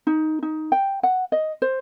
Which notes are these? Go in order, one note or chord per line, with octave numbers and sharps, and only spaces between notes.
D#4
D#4
G5
F#5
D#5
C5